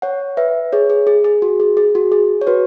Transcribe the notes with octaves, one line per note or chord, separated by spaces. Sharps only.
C#5 F#5
B4 E5
G#4 C#5
G#4
G#4
G#4
F#4
G#4
G#4
F#4
G#4
C#5
F#4 B4